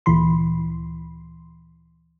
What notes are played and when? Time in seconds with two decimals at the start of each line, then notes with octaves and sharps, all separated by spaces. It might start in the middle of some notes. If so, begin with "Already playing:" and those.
0.06 D2 A#2 E3 B5 C6